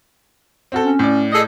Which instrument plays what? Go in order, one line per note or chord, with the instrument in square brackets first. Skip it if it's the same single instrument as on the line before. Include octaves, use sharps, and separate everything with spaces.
[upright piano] C4 F#4 A4
[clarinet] C#4
[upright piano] A2 D5
[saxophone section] G#4 A4 D#5